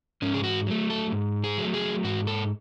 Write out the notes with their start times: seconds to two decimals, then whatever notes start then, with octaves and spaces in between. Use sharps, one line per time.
0.22 G#2 C#4
0.34 G#4
0.44 F#4
0.66 F#3 A3
0.90 A4
1.12 G#2
1.44 G#4
1.58 F#3 A3
1.74 G#4
2.04 G#2 F#4
2.27 A4